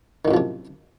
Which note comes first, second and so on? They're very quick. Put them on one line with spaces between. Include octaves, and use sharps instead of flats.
D#3 A2 F#2 F3 C3